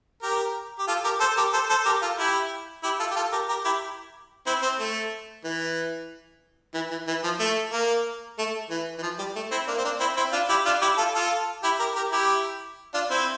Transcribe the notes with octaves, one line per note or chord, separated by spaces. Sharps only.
G4 A#4
G4
F4 A4
G4 A#4
A4 C5
G4 A#4
A4 C5
A4 C5
G4 A#4
F4 A4
E4 G4
E4 G4
F4 A4
G4
F4 A4
G4 A#4
G4 A#4
E4 G4
C4 E4
C4
A3
E3
E3
E3
E3
F3
A3
A#3
A3
E3
E3
F3
G3
A3
C4 E4
A#3 D4
C4
A#3 D4
C4 E4
C4 E4
D4 F4
E4 G4
D4 F4
E4 G4
F4 A4
F4 A4
E4 G4
G4 A#4
G4 A#4
E4 G4
D4 F4
C4 E4